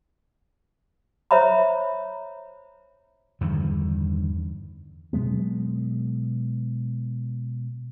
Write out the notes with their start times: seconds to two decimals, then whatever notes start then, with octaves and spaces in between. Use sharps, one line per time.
1.31 C5 C#5 E5 A#5 B5
3.41 E2 G2 D3 D#3
5.13 B2 F#3 G#3 B3